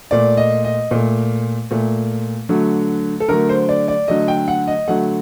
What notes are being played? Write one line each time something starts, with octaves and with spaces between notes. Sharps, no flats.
A#2 A3 D5
D#5
D#5
A#2 A3
A#2 A3
D3 F#3 A3
A4
D3 F#3 A3 A#4
C5
D5
D5
D3 F#3 A3 D#5
G5
F#5
D#5
D3 F#3 A3 F#5